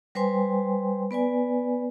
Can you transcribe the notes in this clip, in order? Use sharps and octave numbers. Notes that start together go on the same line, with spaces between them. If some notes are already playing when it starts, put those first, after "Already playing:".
G3 B4 C5 G5 G#5 C6
B3 B4 D5 G#5